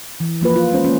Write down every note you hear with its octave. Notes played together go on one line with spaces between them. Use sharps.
E3
F3 A#3 F4 B4
F4
G#3 C#4 C5
A#3 C#4